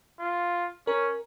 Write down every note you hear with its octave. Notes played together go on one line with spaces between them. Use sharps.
F4
C#4 A#4